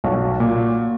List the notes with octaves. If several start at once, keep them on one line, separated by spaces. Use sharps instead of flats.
B1 F#4
A#2